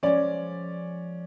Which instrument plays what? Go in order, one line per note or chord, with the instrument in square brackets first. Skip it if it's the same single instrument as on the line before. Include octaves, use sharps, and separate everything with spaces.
[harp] F3 G#3 [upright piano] C#4 D5